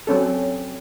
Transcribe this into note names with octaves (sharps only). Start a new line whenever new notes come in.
F#3 C4 C#4 A4